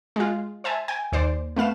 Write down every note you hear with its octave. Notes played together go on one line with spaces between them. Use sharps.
G#3 F4
C5 E5 G#5 A5
G5 G#5
D#2 C5 D5
A3 B3 F5 E7